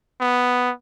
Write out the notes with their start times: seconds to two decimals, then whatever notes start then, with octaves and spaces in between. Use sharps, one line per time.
0.21 B3